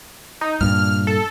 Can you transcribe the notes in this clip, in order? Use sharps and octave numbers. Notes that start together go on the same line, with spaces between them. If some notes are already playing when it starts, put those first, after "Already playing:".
D#4
G2 A#2 F6
A4